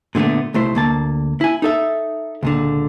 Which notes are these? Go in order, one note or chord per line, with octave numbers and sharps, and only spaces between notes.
A#2 D3 G3 A3 B3
B1 C3 A3 E4 C5
D2 A#3 A5
E4 G#5
D#4 A4 E5
C#2 A#2 D3